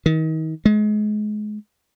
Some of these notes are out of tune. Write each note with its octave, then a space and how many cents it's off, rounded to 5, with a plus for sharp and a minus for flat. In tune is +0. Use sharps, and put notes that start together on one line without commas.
D#3 +35
G#3 +30